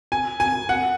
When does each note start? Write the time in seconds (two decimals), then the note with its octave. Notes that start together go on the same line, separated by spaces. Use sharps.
0.12 G#5
0.40 G#5
0.69 F#5